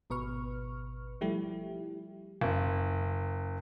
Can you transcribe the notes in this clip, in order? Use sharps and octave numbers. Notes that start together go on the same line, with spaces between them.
G#1 B2 B4 C#6 F6
F3 G3 A3 E4 G4
F#1